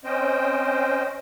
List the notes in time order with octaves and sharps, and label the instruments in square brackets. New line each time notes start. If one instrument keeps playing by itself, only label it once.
[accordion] C4 C#4 C5 D#5 G5